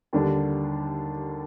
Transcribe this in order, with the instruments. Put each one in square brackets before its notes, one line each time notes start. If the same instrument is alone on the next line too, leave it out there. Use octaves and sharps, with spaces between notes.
[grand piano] D#2 D3 G3 D4